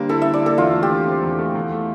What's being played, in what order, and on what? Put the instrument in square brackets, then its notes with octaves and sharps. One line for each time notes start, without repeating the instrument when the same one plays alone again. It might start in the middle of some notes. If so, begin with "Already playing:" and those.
Already playing: [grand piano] D3 G3 A#3 [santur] C5
[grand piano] E4 [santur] A4
[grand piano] D3 [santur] E5
[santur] D5
[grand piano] A#3 [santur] A4
[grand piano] E2 [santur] F4
[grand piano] A3
[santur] G4
[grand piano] D3
C4
E2
A3
E2
A3